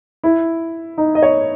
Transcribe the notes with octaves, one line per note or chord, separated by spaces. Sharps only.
E4
D#4
D#5
C#5